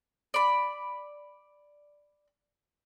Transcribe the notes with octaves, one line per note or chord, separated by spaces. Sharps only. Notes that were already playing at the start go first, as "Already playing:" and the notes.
D5 B5